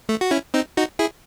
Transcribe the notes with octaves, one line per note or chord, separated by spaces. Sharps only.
A3
F#4
C#4 E4
C4 D#4
D#4 F#4
E4 G#4